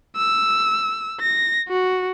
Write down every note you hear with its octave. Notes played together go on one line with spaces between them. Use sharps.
E6
A#6
F#4